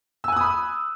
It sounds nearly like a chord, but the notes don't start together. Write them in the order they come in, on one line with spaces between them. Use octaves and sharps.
E6 G#5 F#6 D#6 B5